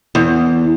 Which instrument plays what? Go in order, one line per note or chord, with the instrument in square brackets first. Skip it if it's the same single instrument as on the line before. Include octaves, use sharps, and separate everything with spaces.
[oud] E2